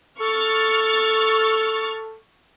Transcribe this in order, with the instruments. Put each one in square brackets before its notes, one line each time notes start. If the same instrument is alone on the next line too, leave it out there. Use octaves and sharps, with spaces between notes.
[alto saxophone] A4 [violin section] C#6 F6 A6